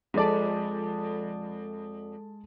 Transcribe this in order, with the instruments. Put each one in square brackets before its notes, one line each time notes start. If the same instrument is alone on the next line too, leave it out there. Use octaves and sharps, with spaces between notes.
[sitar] F2 D5 [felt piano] G#3 A4 A5